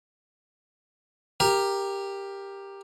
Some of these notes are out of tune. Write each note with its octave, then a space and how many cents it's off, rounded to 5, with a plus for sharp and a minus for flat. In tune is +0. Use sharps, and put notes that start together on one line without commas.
G4 +10 A#4 +0